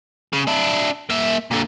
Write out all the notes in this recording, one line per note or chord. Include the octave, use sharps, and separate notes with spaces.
C#3
D4 E4
A#3 E5
A#2 D3